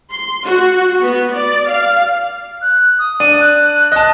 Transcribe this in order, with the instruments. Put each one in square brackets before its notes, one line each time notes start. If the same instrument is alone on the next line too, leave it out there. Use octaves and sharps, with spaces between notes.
[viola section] C6
F#4
B3
D5
F5
[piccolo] F#6
D#6
[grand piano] D4 [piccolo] D#7
[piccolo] F#6
[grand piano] D#5 A5